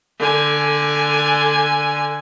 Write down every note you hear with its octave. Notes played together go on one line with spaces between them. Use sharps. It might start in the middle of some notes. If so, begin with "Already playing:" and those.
D3 G#5